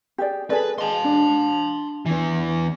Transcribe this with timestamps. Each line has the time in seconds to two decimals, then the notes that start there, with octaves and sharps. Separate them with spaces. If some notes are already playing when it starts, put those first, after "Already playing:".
0.18 G4 G#4 D5
0.50 G#4 A4 B4 D5
0.78 G#4 D#5 A5 C6
1.04 D4
2.06 E2 E3